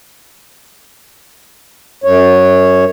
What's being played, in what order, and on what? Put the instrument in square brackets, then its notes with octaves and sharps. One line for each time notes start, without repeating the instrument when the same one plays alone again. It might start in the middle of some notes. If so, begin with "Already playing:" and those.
[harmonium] F#2 C#5